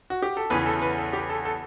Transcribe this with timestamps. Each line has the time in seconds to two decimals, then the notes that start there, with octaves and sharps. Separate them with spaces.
0.10 F#4
0.22 G4
0.37 A4
0.50 E2 C#3 E3 B4
0.66 A4
0.82 B4
0.98 A4
1.13 G4
1.29 A4
1.45 A4